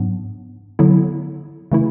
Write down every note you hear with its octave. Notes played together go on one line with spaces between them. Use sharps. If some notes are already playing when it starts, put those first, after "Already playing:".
Already playing: G#2 F#3 B3 D4
D3 F#3 B3 E4
C#3 E3 A3 E4